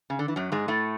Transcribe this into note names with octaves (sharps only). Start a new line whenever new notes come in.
C#3
D3
E3
F#2 F#3
G#2 G#3
A2 A3